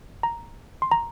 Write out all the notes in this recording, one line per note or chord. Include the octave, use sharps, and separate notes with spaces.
A#5
C6
A#5